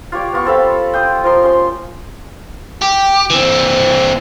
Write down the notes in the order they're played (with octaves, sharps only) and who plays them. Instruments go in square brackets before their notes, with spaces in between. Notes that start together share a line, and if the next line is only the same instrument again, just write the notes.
[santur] F4 G4 C#5 D5
B3 F4 C#6
C4 A4 F5 B5
G5 C6 D#6
F3 A#4 C6
C#4 C6
[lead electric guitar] G4
E3 C4